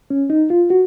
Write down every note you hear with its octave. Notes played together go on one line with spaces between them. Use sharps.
C#4
D#4
F4
F#4